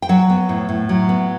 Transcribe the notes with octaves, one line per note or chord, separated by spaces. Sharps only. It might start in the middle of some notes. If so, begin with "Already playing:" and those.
G5
F#3 F#5
B3
A2
A2
F#3
B3